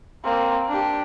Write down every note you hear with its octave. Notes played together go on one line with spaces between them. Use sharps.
A#3 C4
D4 G4